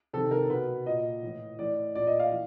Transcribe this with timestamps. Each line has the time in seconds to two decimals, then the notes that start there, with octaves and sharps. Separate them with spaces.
0.13 C3 D#3 A4
0.31 A#4
0.50 B2 B4
0.86 A#2 D#5
1.23 A2 E3
1.58 A2 E3 D5
1.95 A#2 D5
2.07 D#5
2.19 F5
2.31 E3